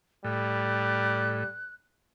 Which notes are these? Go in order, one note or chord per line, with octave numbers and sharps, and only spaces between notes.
A2 G3 F#6